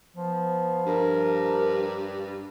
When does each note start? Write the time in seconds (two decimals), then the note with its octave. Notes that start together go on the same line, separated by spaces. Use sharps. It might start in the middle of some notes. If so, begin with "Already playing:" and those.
0.16 F3 B3
0.86 G2 A#4